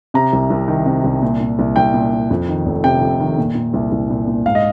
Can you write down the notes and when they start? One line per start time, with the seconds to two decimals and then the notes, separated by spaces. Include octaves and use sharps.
0.14 C3 A#5
0.33 C2
0.50 C2
0.68 D#3
0.86 C3
1.04 C2
1.22 A#2
1.41 A#2
1.59 C2
1.76 C2 G5
1.94 A#2
2.13 A#2
2.31 F2
2.48 D#3
2.66 F1
2.84 C3 G5
3.02 F2
3.20 D#3
3.38 A#2
3.55 A#2
3.74 C2
3.92 C2
4.10 A#2
4.28 A#2
4.46 G#2 F5
4.55 D#5